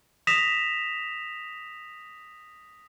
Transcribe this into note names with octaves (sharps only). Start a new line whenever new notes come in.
D#6 A#6 B6 E7 F7